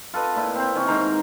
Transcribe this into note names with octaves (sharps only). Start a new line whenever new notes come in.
F4 A4 B4 D#5
A#2 E4
C4 C5
D#3 C#4
G#2 A#4 C5 A#5